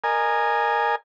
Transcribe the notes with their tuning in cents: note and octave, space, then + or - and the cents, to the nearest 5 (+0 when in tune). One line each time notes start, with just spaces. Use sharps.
A#4 +0 D#5 -25 G#5 +0